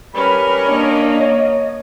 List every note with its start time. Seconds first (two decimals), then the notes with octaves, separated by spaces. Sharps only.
0.15 G3 C#4 A#4 B4 B5
0.68 A#3 D4 D#5
1.21 C#5